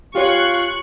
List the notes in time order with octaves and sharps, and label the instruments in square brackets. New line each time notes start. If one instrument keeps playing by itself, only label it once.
[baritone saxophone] F4 [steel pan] G4 C#5 [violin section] C#6 F#6 C#7